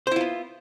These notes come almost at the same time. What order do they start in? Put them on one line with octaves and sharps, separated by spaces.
C5 E4 F4 B3